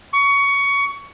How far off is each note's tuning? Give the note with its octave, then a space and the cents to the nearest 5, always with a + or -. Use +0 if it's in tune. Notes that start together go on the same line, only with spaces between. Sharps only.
C#6 +20